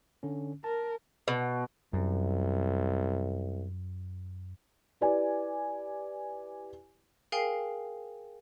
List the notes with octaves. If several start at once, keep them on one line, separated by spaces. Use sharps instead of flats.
D3 C#4
A#4 A5
B2
C2 F#2
E4 G4 B4 D5 G#5
G#4 A#4 F5 G5 G#5 C7